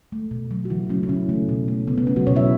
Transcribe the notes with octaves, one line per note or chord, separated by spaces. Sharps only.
A3
B2
F#3 A3
F#4
C#3 E3 E4
F#3 A3 C#4
E4
C#3 C#4
E3 A3
B2
A3
C#3 B3
B3
A3 C#4
F#3 F#4
B2 C#4 C#5
E4 E5